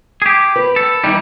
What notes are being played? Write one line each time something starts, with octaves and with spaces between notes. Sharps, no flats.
G4 G#4
B4
A4
E3 G3 D#4